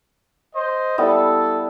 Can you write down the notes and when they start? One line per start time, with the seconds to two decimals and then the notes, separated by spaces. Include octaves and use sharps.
0.55 C5 D#5
0.98 G3 B3 E4 A4